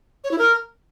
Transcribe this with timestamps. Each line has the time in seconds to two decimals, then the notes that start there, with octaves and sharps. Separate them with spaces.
0.24 C#5
0.31 E4
0.38 A#4